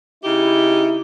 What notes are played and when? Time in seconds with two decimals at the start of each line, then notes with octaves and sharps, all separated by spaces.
0.24 C#3 D#4 E4 G4